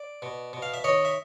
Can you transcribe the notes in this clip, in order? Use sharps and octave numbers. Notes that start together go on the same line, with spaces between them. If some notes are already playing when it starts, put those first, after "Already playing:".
Already playing: D5
B2
B2
F5
E5
D#3 C#5 D#5
E5